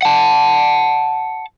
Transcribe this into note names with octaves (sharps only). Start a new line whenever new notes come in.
F#5 A5